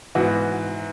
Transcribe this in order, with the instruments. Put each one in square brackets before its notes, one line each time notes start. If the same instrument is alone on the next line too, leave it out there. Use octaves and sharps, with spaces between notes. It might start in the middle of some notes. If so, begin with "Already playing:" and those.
[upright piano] G#2 E3 B3 F#4